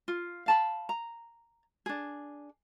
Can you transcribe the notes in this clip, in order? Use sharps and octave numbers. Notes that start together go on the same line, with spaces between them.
F4
F5 A5 B5
A#5
D4 G#4